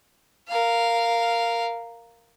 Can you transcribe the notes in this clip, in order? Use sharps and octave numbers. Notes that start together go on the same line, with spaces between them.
A#4 F5